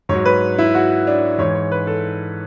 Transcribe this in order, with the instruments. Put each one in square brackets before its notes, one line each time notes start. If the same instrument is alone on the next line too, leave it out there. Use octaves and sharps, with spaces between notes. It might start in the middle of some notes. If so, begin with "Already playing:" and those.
[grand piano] G#2 F#3 C#5
B4
E4
F#4
D4
G#2 E3 C#5
C#5
B4
A4